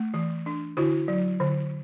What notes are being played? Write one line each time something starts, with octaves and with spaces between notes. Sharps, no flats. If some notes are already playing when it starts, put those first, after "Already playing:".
Already playing: A3
E3
D4
D3 E4 F#4
F#3
D3